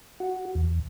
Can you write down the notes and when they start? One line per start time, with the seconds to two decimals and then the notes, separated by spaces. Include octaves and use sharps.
0.20 F#4
0.55 E2